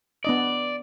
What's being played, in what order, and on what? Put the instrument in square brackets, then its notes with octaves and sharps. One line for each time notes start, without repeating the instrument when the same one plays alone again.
[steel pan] B3 D4 D#5 [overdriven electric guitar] D5